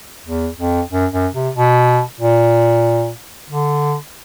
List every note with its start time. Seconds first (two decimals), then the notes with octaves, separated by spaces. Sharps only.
0.26 E2
0.59 F2
0.91 F#2
1.12 F#2
1.34 C3
1.56 B2
2.20 A#2
3.50 D3